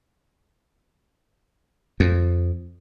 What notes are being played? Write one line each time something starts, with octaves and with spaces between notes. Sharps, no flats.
F2